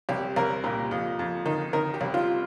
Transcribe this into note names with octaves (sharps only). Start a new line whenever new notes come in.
C2 G4
C2 A#4
A#2 G4
F2
F2
D#3
D#3 A#4
G4
C2
F4